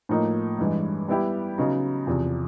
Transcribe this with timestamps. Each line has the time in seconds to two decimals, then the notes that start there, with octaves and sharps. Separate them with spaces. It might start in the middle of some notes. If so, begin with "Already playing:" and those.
0.09 A2 F3 A#3 D#4
0.59 G2 E3 G#3
1.08 G3 B3 E4 G4
1.58 C#3 F#3 B3 D#4
2.07 E2 C3 F3